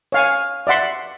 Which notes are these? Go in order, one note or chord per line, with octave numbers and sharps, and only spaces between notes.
C#5 F5 G#5
D5 E5 F#5 C6